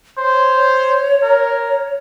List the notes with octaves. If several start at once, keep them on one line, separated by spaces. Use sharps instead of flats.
C5 C#5
A#4